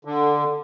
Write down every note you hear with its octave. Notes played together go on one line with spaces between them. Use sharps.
D3